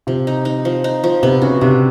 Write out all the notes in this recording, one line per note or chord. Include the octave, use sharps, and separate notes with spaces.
C3 F3
D#4
D#4
F3
D#4
F3
C3 B3
C#3 F#4
C3 D4